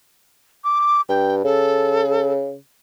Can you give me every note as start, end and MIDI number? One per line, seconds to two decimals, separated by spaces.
0.64 1.01 86
1.09 1.44 43
1.09 1.36 79
1.44 2.55 49
1.44 2.31 69